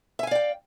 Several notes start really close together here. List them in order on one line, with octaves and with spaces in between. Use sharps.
E5 G#5 F5 D5 G5